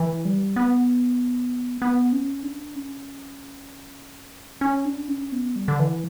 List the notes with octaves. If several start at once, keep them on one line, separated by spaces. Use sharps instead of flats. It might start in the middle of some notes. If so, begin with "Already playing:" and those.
Already playing: E3
G3
B3
B3
C#4
D4
C#4
C#4
D4
C#4
B3
G3
D3
E3